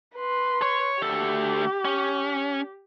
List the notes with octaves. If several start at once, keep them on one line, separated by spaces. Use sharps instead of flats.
B4 C6
C#5
D2 G4 A4
C#4